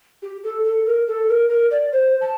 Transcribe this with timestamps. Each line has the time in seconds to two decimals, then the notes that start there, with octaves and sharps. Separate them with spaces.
0.22 G4
0.44 A4
0.64 A4
0.86 A#4
1.08 A4
1.29 A#4
1.50 A#4
1.71 D5
1.93 C5
2.21 A5